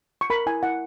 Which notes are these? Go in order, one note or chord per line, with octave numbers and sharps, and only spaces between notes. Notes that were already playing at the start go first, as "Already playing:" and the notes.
C#6
A#4 B5
E4 G#5
E4 F#5